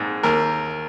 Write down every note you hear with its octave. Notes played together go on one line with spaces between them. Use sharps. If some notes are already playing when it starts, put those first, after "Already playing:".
Already playing: A#1 G#2
D#2 A#4